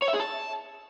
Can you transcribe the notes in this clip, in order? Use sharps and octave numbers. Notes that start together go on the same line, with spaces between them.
C#5
E5
G#4
A5